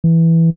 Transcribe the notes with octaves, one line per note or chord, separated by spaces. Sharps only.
E3